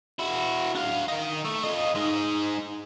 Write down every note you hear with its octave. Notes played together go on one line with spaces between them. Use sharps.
E4 F#4
D4 F5
D#3 D#4
A3
F4 D#5
G#3 D#4